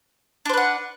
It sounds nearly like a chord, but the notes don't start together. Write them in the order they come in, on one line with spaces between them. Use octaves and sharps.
D4 C5 B4 F#5